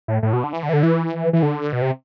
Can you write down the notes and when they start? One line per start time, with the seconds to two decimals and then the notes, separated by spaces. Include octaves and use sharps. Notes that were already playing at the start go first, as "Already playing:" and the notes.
0.08 A2
0.23 A2
0.33 B2
0.44 D3
0.53 E3
0.63 D3
0.69 E3
0.73 D3
0.83 E3
1.33 E3
1.43 D3
1.73 B2
1.82 C3